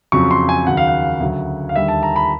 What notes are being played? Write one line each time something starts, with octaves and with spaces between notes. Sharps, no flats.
F2 C#3 F#3 C#6
C6
G#5
D#2 C#3 F#3 F#5
F5
F#5
D2 C#3 F#3
F5
D#2 D3 G3 E5
A5
A#5
B5